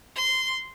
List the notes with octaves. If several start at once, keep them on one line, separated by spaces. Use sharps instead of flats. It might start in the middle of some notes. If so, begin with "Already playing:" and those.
C6